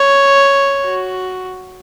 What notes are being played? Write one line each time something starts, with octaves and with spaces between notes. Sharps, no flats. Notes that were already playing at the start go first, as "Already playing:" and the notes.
Already playing: C#5
F#4